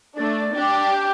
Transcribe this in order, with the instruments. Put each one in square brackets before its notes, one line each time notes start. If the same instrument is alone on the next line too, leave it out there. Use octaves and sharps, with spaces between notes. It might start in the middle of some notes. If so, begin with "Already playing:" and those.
[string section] A3 D4 [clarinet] D5
[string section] D4 G4
[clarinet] G5